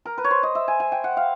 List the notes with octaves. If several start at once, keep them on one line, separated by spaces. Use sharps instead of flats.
A#4
B4
C#5
C5
D#5
E5
G#5
G#5
G5
F#5
F5